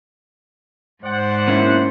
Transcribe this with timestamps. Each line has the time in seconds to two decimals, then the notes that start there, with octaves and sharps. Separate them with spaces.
1.04 G#2 C5 D5 F#5
1.48 A#3 C#4 E4